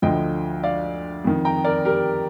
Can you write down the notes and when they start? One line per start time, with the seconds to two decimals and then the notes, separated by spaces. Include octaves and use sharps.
0.02 D2 D3 F3 D#5 G5
0.64 D5 F5
1.24 F2 D#3
1.45 G5 A#5
1.64 A#4 D5
1.85 G4 A#4